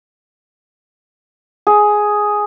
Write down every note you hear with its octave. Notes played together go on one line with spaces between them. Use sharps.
G#4